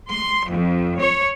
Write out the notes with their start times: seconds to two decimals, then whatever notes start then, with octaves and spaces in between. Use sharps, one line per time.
0.10 C6
0.50 F2
0.99 C#5